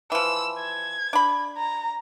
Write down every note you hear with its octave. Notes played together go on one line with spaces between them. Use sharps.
E3 F3 E6
G#6
D4 B5
A#5